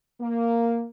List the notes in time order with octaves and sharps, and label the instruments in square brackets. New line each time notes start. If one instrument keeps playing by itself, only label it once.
[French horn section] A#3